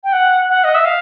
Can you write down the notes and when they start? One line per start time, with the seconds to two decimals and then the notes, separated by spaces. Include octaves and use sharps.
0.04 G5
0.13 F#5
0.49 F#5
0.64 D#5
0.75 E5
0.85 F5